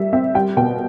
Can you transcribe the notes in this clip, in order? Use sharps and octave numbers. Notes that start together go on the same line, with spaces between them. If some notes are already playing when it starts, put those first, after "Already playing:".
Already playing: G3 E5
C4 E5
G3 G5
B2 G5